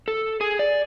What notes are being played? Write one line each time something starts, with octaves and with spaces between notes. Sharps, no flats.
A4
G#4
D5